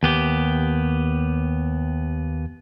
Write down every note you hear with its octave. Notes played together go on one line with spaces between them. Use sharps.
D#2 B3 G4